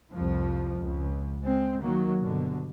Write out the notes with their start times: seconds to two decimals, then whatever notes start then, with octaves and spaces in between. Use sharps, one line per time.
0.12 C2 F2 F3
0.79 C#2
1.42 G#3 C4
1.82 D#3 F#3 A#3
2.21 G1 B2 D3